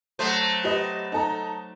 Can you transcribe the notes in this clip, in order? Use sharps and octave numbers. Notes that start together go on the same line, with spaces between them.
F#3 A3 C5
G4 B4 D#5
D#4 A4 A#5